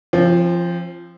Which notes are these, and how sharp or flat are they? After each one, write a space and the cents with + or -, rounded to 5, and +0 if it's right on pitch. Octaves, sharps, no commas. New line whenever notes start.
F3 -15 C4 +30